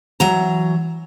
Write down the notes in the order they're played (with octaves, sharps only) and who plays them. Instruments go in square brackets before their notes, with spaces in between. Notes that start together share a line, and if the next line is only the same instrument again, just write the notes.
[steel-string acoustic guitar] E3 F#3 A#5